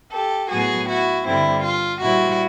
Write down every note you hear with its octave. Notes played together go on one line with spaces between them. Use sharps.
G4 A4
A2 F#3 B3 F#4 G#4
E4 F#4
G2 D3 G3 C4 E4
F4
A#2 G3 C4 E4 F#4